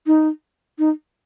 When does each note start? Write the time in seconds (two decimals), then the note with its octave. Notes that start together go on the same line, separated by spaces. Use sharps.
0.07 D#4
0.79 D#4